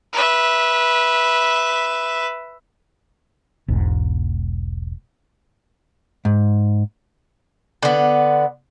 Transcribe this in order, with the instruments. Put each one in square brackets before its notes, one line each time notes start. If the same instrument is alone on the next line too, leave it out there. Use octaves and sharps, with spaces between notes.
[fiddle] B4 E5
[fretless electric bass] E1 B1 G#2
[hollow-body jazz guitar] G#2
[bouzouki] D3 B3